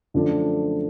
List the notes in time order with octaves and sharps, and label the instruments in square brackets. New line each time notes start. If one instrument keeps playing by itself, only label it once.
[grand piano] F#2 D3 F3 A3 D4